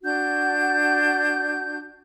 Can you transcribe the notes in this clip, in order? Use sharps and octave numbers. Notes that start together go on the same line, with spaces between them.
D4 F#4 G6